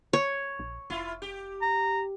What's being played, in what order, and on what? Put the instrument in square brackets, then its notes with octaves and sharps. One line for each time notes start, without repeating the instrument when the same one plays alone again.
[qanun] C#5
[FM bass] A#1
[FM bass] F1 [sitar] E4 F4
[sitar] G4
[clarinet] A#5